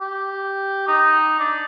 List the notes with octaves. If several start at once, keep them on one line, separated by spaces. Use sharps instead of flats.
G4
D#4
D4